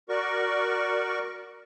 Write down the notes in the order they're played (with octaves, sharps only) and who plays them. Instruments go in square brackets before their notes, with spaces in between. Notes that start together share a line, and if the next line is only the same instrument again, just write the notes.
[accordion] F#4 A#4 D5 C#6